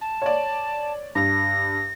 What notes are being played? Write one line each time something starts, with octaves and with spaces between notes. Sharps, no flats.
A5
C#5 D5
G2 A#6